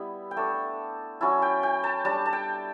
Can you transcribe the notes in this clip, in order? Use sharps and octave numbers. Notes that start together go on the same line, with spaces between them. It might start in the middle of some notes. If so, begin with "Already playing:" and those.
Already playing: G3 B3 E4
G5
A3 D4 A5
F#3 C#4 E4 A5
G5
G5
A5
G3 D4 A5
A5
G5